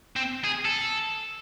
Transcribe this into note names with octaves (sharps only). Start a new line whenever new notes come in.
C4
G#4
A4